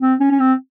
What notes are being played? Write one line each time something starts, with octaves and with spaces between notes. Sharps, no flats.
C4
C#4
C#4
C4